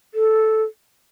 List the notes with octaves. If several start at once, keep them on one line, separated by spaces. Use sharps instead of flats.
A4